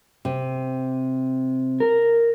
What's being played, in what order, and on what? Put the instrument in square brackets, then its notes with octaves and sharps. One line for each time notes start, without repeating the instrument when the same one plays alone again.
[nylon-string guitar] C3
[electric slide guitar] A#4